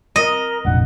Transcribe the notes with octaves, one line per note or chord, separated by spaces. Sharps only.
A#4 D#5
F1 A#1 F#5